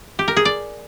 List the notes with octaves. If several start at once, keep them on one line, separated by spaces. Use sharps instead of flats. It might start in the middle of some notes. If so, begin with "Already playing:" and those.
G4
A#4
G#4
D5